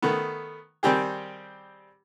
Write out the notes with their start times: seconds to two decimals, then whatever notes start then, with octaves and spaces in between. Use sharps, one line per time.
0.02 D#3 A3 B3
0.83 D#3 G3 C4 G4 G#4